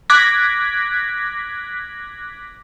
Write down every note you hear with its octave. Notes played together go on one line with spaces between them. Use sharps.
D6 F#6 G#6 A#6 B6